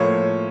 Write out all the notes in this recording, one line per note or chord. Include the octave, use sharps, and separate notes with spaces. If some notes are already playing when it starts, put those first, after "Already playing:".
Already playing: A2 F3 A#3 C#5